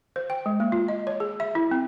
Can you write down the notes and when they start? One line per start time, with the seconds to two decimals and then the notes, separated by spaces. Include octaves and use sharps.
0.16 C5
0.30 G5
0.46 G#3
0.60 A#3
0.72 F4
0.88 D#5
1.07 C#5
1.20 G#4
1.40 E5
1.55 E4
1.71 C4